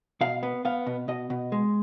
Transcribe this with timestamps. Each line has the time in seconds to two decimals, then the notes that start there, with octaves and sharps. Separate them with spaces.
0.21 B2 F5
0.43 B3
0.65 B3 F5
0.86 B2
1.08 B2 D#5
1.30 B2
1.52 G#3